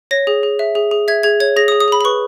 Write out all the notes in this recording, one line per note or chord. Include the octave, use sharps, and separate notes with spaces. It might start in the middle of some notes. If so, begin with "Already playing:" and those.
C#5 A#6
G#4
G#4
E5
G#4
G#4
E5 G#6
G#4 G#6
C#5 G#6
G#4 A#6
D#6
G#4
D#6
G#4 B5
B5
B4 C#6